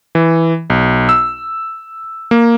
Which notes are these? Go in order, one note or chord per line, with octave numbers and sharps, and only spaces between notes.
E3
B1
E6
A#3